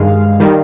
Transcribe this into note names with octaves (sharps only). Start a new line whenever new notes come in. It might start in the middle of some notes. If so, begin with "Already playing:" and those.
Already playing: G2 D#3 G#3 F5
D#3 G3